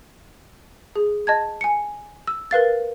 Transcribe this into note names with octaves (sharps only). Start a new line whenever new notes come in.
G#4
D#5 A5 G#6
G#5 C#7
E6
A#4 B4 F5 A6